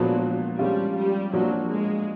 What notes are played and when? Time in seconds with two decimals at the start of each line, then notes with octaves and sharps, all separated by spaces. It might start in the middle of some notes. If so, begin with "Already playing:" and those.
Already playing: A#2 F3 F#3 G#3 B3 D4
0.59 F3 G3 G#3 C#4 F4
0.96 G3
1.33 F3 F#3 A#3 D4 F#4
1.70 G#3